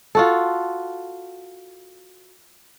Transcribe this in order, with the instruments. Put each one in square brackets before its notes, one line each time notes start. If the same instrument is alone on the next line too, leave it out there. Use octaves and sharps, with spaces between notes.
[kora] F4 F#4 A4